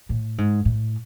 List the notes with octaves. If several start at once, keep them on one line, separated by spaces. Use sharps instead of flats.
A2
G#2
A2